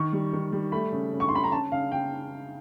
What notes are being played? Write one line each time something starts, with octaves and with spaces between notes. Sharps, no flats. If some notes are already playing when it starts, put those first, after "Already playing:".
Already playing: D#3 C#6
G3
D#3
G3
A3 B5
C#3
C#3
C#6
C6
C#3 B5
A#5
C#3 A5
C#3 F5
C#3 G5